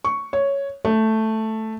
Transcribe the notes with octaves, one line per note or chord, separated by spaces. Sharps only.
C#6
C#5
A3